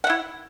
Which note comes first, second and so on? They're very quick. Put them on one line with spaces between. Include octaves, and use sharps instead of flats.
F#5 E5 E4